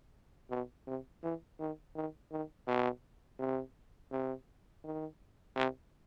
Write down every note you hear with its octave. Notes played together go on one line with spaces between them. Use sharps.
B2
C3
E3
D#3
D#3
D#3
B2
C3
C3
D#3
C3